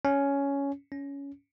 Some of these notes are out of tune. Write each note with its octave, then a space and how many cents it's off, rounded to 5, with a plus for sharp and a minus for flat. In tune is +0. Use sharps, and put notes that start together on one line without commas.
C#4 +10
C#4 +15